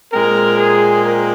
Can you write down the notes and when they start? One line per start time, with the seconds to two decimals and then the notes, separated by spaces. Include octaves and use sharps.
0.13 A#2 G#3 C4 A#4
0.58 G#4
1.04 A#4